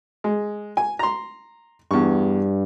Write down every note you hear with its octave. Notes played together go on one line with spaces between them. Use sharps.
G#3
G#5
A#5 C6
E2 G2 C#6